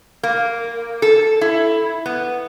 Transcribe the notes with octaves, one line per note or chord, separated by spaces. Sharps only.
A#3
A4
E4
B3